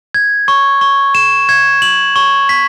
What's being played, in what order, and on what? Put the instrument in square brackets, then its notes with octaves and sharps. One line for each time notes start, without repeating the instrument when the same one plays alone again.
[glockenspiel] G#6
C#6
C#6
E7
G#6
F#7
C#6
B6